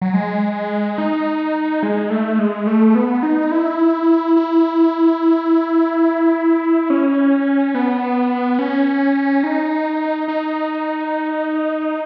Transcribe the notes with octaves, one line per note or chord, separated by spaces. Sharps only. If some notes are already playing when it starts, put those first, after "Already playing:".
F#3
G#3
D#4
G#3
A3
G#3
A3
B3
D#4
E4
E4
C#4
B3
C#4
D#4
D#4